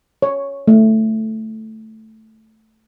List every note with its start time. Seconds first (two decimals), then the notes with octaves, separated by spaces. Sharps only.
0.22 C#5
0.68 A3